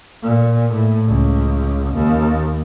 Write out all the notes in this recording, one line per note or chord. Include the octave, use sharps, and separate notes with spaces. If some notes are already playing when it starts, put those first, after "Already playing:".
A#2
A2
C#2
D#2